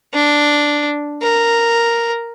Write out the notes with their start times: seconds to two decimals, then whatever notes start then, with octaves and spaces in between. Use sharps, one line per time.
0.14 D4
1.22 A#4